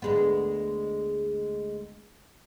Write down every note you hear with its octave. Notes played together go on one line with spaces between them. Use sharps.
D2 G#3 B3